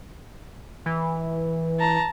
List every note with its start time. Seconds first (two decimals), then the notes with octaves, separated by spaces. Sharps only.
0.86 E3
1.80 A5 A#5